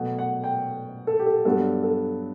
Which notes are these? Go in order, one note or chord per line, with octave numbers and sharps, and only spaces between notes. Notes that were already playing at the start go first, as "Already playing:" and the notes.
Already playing: B2 F#3 A3
F#5
G5
A4
G4
A4
G2 F#3 B3 D4 A4
A4